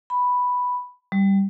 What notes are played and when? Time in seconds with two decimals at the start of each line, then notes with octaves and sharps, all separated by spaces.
0.10 B5
1.12 G3